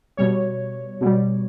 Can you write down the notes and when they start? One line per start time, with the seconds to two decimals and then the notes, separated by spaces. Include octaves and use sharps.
0.17 B2 G3 C#5
1.01 B2 G3